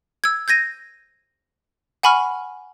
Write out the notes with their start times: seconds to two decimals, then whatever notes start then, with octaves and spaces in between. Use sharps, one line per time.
0.24 E6 G#6
0.48 G6 G#6 A#6 D#7
2.03 F#5 G#5 B5 C#6 F6